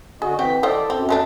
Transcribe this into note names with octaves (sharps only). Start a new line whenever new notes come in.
D3 F#4 G#4 D#5
E3 C4 F#4 G5 B6
E4 A4 C5 D5 D#5
F#2 C4
G#3 A3 D4